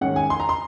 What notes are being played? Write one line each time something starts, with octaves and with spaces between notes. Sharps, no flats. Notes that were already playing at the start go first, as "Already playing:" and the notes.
G#2 D#3 G#3 C#4 F#5
G#5
C6
A#5
C6